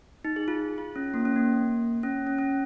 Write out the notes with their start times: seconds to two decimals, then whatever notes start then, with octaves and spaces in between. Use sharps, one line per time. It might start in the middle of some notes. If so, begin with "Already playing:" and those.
0.25 D#4
0.36 G#4
0.48 F4
0.78 F4
0.96 C#4
1.14 A#3
1.25 C#4
1.36 A#3
2.03 C#4
2.27 C#4
2.38 C#4